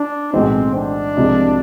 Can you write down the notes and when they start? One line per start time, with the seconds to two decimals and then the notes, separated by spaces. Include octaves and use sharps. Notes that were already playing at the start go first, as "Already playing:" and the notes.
Already playing: D4
0.33 B1 A2 E3 G#3 C4
0.75 D4
1.17 C2 C3 F3 G#3